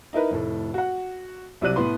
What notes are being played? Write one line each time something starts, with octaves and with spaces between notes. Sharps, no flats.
D#4 E4 A#4 B4
F1 A2 A4
F#4 F#5
C2 C3 F#3 D5 F#6 D#7
A2 B3 C6